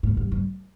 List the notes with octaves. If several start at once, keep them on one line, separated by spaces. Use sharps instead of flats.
A2
G2
G2